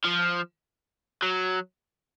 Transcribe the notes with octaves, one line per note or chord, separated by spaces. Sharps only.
F3
F#3